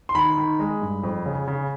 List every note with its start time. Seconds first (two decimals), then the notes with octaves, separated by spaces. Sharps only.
0.09 C6
0.15 D#3 B5
0.37 D#3
0.59 G#3
0.82 G2
1.03 F2
1.26 C#3
1.48 C#3